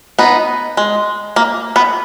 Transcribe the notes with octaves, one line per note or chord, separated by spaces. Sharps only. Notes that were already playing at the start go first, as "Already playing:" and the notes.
B3 D#4
G#3
A#3
B3